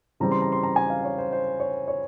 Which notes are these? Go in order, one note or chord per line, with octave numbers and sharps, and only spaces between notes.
C#3 E3 G3 C4 A#5
C6
A#5
C6
A#5
G#5
F5
C#5
C5
C5
C#5
C#5